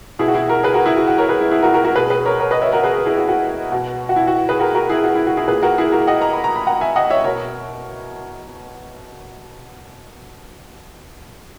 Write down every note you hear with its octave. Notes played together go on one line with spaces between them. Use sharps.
B2 E4 G#4
F#4
E4 G#4
F#4 A#4
G#4 B4
F#4 A#4
E4 G#4
F#4
F#4
A#4 C#5
G#4 B4
E4
E4 G#4
F#4 A#4
F#4 A#4
F#4 A#4
B2 G#4 B4
G#4 B4
A#4 C#5
A#4 C#5
B4 D#5
C#5 E5
F#4 A#4
G#4 B4
E4 G#4
F#4
F#4
B2
F#4
E4
F#4
G#4 B4
F#4 A#4
F#4 A#4
E4 G#4
F#4
E4
F#4
E4 G#4
A#2 G#4 B4
F#4 A#4
E4 G#4
F#4 A#4
D#5 F#5
A#5
B5
A#5
B5
F#5 A#5
E5 G#5
D#5 F#5
C#5 E5
B2 A#4 C#5